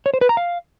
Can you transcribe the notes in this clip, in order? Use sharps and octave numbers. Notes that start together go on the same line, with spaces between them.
C#5
C5
B4
A#5
F5